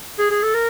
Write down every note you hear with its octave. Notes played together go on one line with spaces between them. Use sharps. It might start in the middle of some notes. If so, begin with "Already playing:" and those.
G#4
G#4
A4
A#4